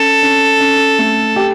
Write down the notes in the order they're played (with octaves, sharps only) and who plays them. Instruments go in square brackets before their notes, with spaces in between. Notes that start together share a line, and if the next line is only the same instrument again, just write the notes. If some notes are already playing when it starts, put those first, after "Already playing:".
Already playing: [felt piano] C#4 [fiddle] A4
[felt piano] C#4
C#4
A3
G4